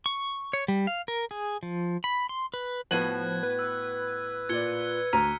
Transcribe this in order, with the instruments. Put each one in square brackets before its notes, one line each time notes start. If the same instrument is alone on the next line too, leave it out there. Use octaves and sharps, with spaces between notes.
[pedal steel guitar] C#6
C#5
G3
F5
A#4
G#4
F3
B5
C6
B4
[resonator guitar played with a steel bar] A2 F#4 [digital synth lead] F3 [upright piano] B3 D#7 F#7 [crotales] F#6 G#6
[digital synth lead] B4
[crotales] E6
[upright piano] A#2 D5 [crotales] G#6 C#7 G7
[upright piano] D2 [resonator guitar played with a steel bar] A#5 [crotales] F6 B6 D#7